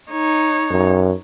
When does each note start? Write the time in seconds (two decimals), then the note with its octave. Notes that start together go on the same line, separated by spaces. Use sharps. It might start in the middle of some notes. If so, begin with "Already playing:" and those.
0.12 D#4 C#5
0.71 F#2